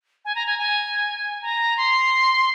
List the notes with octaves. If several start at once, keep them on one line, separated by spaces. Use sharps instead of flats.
G#5
A#5
G#5
G#5
A#5
C6